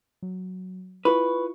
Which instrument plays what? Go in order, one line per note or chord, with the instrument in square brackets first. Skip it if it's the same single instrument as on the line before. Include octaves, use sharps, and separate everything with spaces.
[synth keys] F#3
[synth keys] E4 F4 C#6 [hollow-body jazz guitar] B4